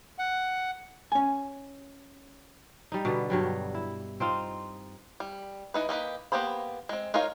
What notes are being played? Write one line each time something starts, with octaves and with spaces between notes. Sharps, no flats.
F#5
C#4 G#5
G3 D#4
B2 D3 B3
G2 F#3 G3
E4
C4 D#4 F4
G3
E3 D#4 B4
A#3 D#4 G4 B4
A#3 B3 G4 C5 B5
G#3 C4
D#4 F4 A#4 C#5 F5